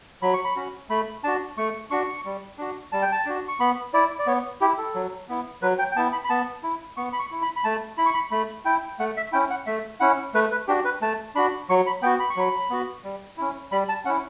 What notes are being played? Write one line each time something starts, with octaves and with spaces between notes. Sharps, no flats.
F#3 B5
C#6
B5
C#4 F#4
A3 B5
D4 F#4 A5
A3 C#6
D4 F#4 C#6
G3
D4 F#4
G3 A5
G5
A5
D4 F#4
C#6
B3 B5
E4 D5
D5
B3 C#5
E4 G4
A4
F#3
B3 E4
F#3 B4
G5
G5
B3 E4 A5
B5
B5
B3 A5
E4
B3 C#6
B5
C#6
E4
B5
B5
A3 A5
E4 B5
C#6
B5
A3 B5
E4 G5
A3 F#5
E5
C#4 E4 G5
F#5
A3 E5
C#4 E4 F#5
A3 B4
B4
D4 F#4 G4
B4
A3 A5
D4 F#4 B5
F#3 C#6
B5
B3 F#4 G5
B5
C#6
F#3 B5
B3 F#4
G3
C#4 E4
G3 B5
A5
C#4 E4 F#5